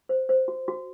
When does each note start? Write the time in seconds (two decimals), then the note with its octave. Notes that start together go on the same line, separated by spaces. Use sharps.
0.09 C5
0.29 C5
0.48 F#4
0.68 F#4